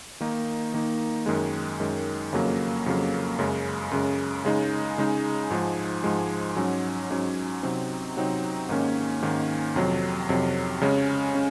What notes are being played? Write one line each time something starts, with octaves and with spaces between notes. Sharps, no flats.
D#3 A#3 D#4
D#3 A#3 D#4
F#2 D#3 G#3
F#2 D#3 G#3
F2 C#3 F#3 A#3
F2 C#3 F#3 A#3
F#2 C#3 G#3
F#2 C#3 G#3
C#3 G#3 D#4
C#3 G#3 D#4
G#2 F3 G#3
G#2 F3 G#3
G#2 F#3 C#4
G#2 F#3 C#4
C3 F#3 C4 D#4
C3 F#3 C4 D#4
G#2 D#3 A#3 C#4
G#2 D#3 A#3 C#4
F2 C3 F#3
F2 C3 F#3
C#3 G#3 C#4
C#4